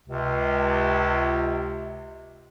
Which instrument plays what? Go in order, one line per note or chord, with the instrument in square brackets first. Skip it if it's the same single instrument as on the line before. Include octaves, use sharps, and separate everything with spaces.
[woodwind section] C#2 C3